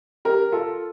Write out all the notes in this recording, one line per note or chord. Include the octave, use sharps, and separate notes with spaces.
G4 A#4
F4 A4